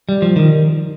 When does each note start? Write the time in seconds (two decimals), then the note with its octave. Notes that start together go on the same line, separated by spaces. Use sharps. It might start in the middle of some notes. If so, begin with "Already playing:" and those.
0.09 G3
0.22 F3
0.36 D#3